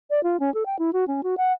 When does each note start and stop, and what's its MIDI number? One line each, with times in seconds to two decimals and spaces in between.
0.10 0.23 74
0.23 0.39 65
0.40 0.52 61
0.54 0.64 69
0.66 0.79 79
0.79 0.91 64
0.93 1.05 66
1.07 1.21 61
1.23 1.35 66
1.37 1.52 78